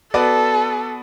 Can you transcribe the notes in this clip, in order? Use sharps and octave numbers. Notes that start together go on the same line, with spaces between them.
B3 F#4 A4 B4 D5